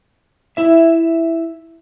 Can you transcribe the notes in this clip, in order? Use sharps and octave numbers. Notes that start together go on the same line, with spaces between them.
E4 E5